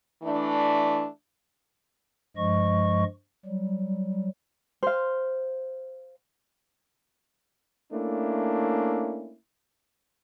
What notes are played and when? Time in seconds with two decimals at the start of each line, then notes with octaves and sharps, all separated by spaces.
0.23 E3 A3 D4
2.37 G2 F3 G#3 D#5 C#6
3.45 F#3 G3
4.83 C5 F5
7.93 A3 A#3 C#4 D4 E4